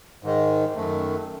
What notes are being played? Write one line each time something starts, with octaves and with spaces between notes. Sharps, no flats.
G#2 D#3 G#3
F#2 D#3 A3